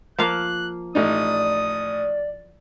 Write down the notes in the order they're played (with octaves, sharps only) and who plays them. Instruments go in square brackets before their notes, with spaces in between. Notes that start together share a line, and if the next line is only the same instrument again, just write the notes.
[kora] F3 A#3 F5 [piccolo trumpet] F#6
[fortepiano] A1 D#4 [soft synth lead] D5 [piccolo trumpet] D#6